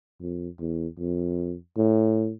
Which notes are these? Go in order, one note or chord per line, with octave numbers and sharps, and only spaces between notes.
F2
E2
F2
A2